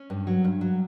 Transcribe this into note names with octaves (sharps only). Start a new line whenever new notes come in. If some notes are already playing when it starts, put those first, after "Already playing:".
Already playing: C#4
G2
F#3
G2
F#3